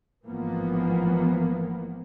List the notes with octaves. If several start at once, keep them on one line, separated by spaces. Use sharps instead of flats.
A1 G#2 E3 F3 A#3 B3